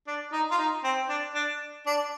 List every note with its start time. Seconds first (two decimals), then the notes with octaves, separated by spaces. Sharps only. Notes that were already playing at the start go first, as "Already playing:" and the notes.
0.08 D4
0.33 D#4
0.51 F4
0.58 D#4
0.84 C4
1.09 D4
1.35 D4
1.87 D4